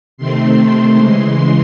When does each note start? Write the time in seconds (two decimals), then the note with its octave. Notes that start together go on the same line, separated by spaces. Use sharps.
0.18 C3 D#3 A3 C4 C6
0.95 C#3 E3 G#3